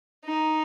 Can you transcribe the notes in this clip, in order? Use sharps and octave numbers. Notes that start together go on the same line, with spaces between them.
D#4